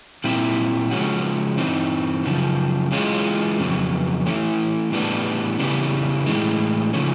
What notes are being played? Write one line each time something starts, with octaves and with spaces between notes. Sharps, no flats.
A#2 G3 C4 E4
C#3 F3 G#3 C#4 F#4
G2 E3 C4 D#4
F#2 C#3 F3
E3 G#3 C#4 F4
F2 C#3 F#3 B3
E3 A3 C#4 E4
A2 E3 G3 B3 D4
C#3 E3 G3 B3
A2 E3 G#3
C#3 F3 A3 C#4